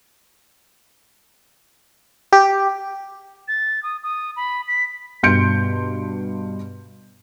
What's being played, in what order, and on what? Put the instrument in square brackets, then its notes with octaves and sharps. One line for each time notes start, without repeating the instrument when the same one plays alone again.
[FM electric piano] G4
[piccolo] A6
D#6
D#6
B5
B6
[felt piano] G2 B2 C6 G6 C#7 D7